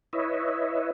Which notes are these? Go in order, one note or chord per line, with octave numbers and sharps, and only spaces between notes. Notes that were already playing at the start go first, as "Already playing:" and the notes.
E4 B4 C#5 D#5 E5